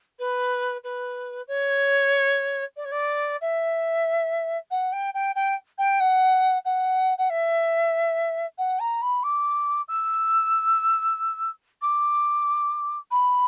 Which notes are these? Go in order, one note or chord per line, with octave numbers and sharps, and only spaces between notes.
B4
B4
C#5
D5
C#5
D5
E5
F#5
G5
G5
G5
G5
F#5
F#5
F#5
E5
F#5
A#5
B5
D6
E6
D6
B5